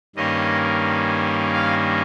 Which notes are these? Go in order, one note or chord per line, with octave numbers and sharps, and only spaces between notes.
G2 D#3 A#3 C#4 D#5
F5